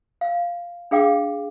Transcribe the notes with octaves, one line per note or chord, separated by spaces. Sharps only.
F5
D4 G#4 F5 G5 D6